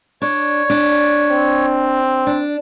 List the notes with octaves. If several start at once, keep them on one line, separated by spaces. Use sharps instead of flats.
D4 C#5
D4
C4
D4